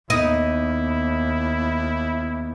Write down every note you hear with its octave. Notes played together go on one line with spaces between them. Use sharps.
D#2 B3 D#4 E4